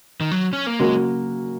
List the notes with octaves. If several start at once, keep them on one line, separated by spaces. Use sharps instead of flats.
D#3
F#3
C#4
A#3
C#3 F#3 G#3 A#3 F#4 A#4